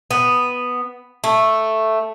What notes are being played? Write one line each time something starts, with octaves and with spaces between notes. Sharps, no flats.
B3
A3